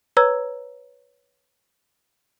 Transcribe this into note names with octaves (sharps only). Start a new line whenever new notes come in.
B4 C#5 A#5 E6 G#6